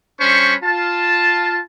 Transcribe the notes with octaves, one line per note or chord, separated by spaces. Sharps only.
G3 C#4 D4 C5 B5 C#6
F4 A5